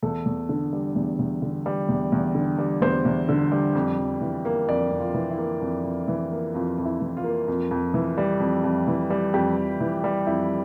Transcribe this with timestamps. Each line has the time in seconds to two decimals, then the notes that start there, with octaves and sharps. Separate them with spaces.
0.03 E2 A4
0.26 E2
0.49 D3
0.73 G3
0.96 E2
1.19 E2
1.42 D3
1.66 G3
1.89 E2
2.12 E2
2.35 D3
2.58 G3
2.82 E2 C5
3.05 E2
3.29 D3
3.52 G3
3.75 F2
3.98 F2
4.21 E3
4.45 A#3
4.68 F2 D5
4.92 F2
5.00 F4
5.14 E3
5.30 E4
5.38 A#3
5.61 F2
5.84 F2
6.08 E3
6.31 A#3
6.54 F2 F4
6.78 F2
6.85 E4
7.01 E3
7.17 F4
7.24 A#3
7.48 F2
7.71 F2
7.94 E3
8.18 G3
8.40 F2
8.64 F2
8.88 E3
9.10 G3
9.34 F2 G4
9.57 F2
9.80 E3
10.04 G3
10.27 F2 E4